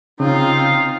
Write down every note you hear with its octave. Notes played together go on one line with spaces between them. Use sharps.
C#3 C4 D#4 F4 F5